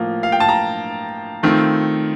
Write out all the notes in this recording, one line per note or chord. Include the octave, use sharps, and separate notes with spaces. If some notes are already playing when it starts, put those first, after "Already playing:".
Already playing: A2 F3 A#3
F5
G5
A5
A#5
D#3 A3 C4 F4